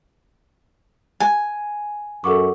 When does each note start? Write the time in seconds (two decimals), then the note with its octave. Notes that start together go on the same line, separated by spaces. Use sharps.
1.20 G#5
2.24 F#2 A4 F#5 C#6 D6